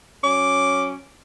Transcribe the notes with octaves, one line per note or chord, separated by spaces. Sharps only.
F#3 C#4 D6